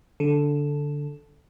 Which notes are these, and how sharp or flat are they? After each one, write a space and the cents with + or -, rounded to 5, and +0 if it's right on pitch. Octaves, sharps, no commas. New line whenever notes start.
D3 -10 A4 +0